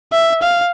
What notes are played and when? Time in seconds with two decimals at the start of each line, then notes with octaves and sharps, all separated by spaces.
0.12 E5
0.42 F5